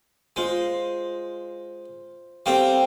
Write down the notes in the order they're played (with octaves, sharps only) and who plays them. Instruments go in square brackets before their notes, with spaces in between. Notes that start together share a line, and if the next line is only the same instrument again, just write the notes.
[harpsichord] G#3 [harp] F4 C5
[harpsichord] G3 C4 [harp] A4 C5 F5